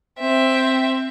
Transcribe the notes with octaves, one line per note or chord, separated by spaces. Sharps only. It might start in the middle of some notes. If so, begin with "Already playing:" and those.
C4 E5